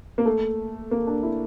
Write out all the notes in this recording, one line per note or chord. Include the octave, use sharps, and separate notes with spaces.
A#3
A3
A#3
D4
E4